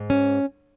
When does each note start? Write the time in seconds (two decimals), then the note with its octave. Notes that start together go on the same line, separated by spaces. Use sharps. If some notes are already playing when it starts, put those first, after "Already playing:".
Already playing: G#2
0.10 C#4